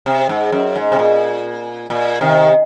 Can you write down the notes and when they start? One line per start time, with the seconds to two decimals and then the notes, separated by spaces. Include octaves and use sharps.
0.06 C3
0.29 G#2
0.52 F#2
0.76 G#2
0.92 C3
0.99 A#2
1.90 A#2
2.21 C3 D#3